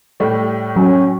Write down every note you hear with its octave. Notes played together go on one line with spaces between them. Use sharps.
A2 G3 A3
F#3 C#4